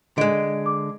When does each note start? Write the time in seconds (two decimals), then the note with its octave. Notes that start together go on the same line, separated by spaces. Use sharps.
0.18 D3 G#3 D#5 D7
0.66 D6